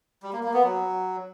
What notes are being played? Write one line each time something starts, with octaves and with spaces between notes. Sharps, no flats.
G3
A#3
A#3
B3
F#3